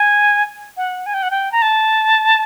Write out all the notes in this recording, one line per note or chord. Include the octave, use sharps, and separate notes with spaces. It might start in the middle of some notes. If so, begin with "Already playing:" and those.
Already playing: G#5
F#5
G#5
G5
F#5
G5
A#5
A5